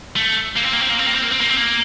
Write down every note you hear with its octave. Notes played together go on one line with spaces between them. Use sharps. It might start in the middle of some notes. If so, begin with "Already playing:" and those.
A3
A#3
C4
A#3
C4
A#3
C4
A#3
C4
A#3
C4
A#3
C4
A#3